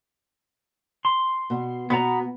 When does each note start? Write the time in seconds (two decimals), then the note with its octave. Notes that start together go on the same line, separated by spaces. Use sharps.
1.05 C6
1.50 B2
1.90 B2 B3 F#5 A#5